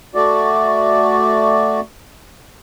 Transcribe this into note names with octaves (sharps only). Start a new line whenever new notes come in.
A3 F#4 D5